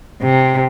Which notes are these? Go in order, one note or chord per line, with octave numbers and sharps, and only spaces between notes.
C3